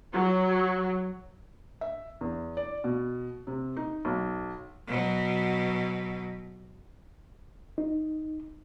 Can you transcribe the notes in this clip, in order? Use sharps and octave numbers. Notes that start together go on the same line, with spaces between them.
F#3
E5
E2
D5
B2
C3
D#4
B1
B2 F#3
D#4